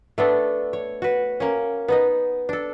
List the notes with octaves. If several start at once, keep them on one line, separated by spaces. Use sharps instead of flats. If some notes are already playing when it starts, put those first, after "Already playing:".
A3 B3 D4 A4
C#5
F#4 B4
A#3 C#4
B3 D#4 D#5
D4 A4